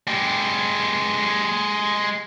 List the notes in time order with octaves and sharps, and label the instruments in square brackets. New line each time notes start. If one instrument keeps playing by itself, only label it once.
[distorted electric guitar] G#3 G4